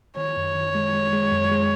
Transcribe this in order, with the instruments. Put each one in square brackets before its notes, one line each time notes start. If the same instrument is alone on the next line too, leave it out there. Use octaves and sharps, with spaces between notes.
[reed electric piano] D#3 [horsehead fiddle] C#5
[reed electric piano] F#2
D#3
G#3
G#3
G#3
F#2
G#3